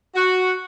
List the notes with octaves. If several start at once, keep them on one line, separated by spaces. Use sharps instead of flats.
F#4